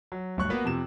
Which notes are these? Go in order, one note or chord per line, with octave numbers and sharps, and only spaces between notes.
F#3
D1 D2 G2 C#5 C#6 F#6
A#3 B3 F#4 A#4 B4
F2 C3 E7